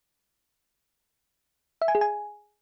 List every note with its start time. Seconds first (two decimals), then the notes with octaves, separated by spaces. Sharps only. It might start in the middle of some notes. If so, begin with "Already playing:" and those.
1.82 E5
1.88 G#5
1.95 G#4
2.01 G#5